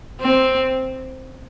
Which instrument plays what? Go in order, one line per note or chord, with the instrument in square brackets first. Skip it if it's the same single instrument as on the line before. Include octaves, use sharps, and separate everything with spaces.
[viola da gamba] C4